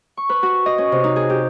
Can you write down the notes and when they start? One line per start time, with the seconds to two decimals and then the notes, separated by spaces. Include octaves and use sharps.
0.17 C#6
0.29 B4
0.43 F#4
0.66 D#5
0.78 C#4
0.92 C3
1.04 D#4
1.16 G#4
1.30 G4